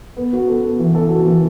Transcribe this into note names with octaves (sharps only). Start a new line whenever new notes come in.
B3
F#4
A4
B3
E3
A4
F#4
E3